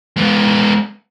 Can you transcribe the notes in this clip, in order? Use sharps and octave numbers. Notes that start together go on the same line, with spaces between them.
G#3 B3